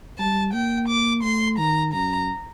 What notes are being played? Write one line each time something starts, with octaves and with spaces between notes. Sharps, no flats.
G3 A5
A#3 G5
D6
A3 C6
D#3 A#5
F#2 A#5